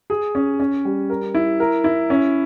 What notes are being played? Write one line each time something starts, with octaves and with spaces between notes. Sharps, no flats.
G#4
C#4
C#4
G3
A#4
E4
A#4
E4
C#4